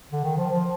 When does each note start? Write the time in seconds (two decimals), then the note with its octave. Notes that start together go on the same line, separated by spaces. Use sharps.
0.11 D3
0.24 D#3
0.37 F3
0.50 F3